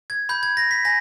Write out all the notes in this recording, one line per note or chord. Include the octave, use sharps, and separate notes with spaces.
G#6
B5 G6
G#6
A#6
B6
G#5 A#6